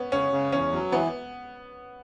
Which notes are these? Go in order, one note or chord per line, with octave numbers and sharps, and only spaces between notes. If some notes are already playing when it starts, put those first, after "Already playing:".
Already playing: B3 C#4
C#3 C#4
C#3
E2 C#4
F#3
E3 B3